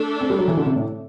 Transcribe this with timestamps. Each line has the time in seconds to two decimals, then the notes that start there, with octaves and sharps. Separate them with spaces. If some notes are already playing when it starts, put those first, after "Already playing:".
Already playing: A3 D4 A4
0.21 C4
0.30 G3
0.39 F#3
0.48 E3
0.57 D3
0.66 C3
0.76 A2